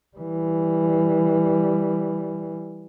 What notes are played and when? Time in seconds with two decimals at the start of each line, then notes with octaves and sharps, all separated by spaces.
0.18 E3 G3